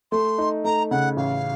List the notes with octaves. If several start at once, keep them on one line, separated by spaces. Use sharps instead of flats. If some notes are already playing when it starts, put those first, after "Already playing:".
A3 C6
D#4
A3 A#5
C#3 F#5
A1 F5